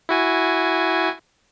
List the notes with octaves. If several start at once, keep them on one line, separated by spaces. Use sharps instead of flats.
E4 F#4 G#5